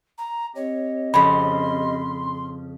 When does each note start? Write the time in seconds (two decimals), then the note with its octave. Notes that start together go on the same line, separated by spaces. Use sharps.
0.18 A#5
0.56 C4 G4 C#5 D#5
1.14 F2 C#3 B5 C6